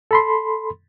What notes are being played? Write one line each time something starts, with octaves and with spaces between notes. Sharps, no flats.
A4 B5 C6